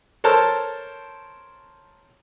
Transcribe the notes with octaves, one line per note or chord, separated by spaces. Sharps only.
A4 A#4 C5 C#5 A5